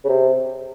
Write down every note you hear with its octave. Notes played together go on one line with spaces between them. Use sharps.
C#3
C3